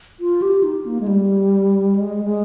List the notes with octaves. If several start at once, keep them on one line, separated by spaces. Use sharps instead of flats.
F4
G4
D#4
A#3
G#3
G3
G#3
G#3